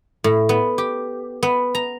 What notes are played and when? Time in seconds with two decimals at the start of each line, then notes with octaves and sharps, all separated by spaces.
0.24 A2
0.49 B3
0.78 G4
1.43 B3
1.75 A#5